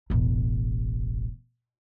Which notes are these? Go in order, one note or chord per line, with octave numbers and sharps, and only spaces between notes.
E1 A1